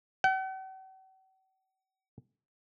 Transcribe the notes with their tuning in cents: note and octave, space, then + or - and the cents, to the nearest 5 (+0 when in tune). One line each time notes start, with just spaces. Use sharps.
F#5 +45